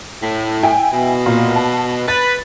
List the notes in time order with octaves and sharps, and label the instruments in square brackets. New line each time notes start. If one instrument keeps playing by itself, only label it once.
[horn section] A2
[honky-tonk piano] E4 G5 G#5
[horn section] B2
[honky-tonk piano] A#2
A5
[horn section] B4 [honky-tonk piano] A6